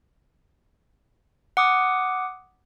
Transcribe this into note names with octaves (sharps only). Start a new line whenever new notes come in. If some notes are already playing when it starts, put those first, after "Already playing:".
F#5 D6 D#6